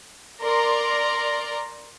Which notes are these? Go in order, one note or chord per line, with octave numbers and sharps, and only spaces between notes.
A#4 D5 A#5 C6